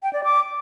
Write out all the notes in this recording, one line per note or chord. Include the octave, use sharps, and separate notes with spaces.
G5
D5
D6